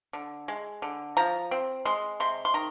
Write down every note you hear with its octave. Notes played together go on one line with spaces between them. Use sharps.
D3
G#3
D3
F3 A#5
C4
G#3 C6
C3 C6
C6
D#3 A#5